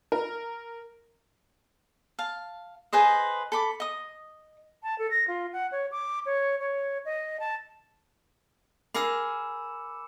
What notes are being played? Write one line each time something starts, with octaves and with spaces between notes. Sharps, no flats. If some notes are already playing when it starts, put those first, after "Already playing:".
A#4
F5 A5
G#4 B4 C5 D#5
A4 B5 D6
D#5 D#6
A5
A4
A#6
F4
F#5
C#5
D6
C#5
C#5
D#5
A5
G#4 A#4 F5 B5 D6 E6 C#7